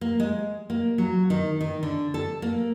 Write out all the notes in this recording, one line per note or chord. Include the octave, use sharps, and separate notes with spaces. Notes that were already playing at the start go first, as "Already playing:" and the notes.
A#3
G#3
A#3
F#3
D#3
D#3
D3
A4
A#3